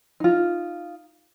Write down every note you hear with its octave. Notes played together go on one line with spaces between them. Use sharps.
D#4 F4